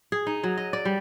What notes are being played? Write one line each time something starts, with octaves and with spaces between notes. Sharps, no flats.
G#4
D#4
F#3
D#5
D5
G3